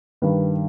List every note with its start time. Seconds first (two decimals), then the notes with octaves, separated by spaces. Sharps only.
0.22 G2 D#3 B4